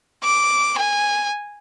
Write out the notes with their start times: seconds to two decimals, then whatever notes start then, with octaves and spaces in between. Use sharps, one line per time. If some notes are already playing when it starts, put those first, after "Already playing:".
0.23 D6
0.79 G#5